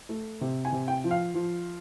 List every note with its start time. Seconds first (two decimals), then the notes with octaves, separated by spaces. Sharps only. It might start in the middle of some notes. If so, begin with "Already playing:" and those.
0.09 A3
0.41 C3
0.65 G#5
0.72 C3
0.88 G5
1.04 F3
1.11 F5
1.34 F3